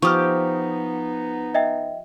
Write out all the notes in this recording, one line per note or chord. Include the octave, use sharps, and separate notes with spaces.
F3 B3 D#4 G4 C#6 D#6 F6
D#5 E5 G5